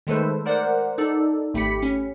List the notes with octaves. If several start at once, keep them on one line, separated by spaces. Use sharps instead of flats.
D#3 G#3 A3 A4 B4 C5
A#4 C5 D5 F#5
D#4 A4 D5
G#1 A3 G4 B5 B6 C#7
C#4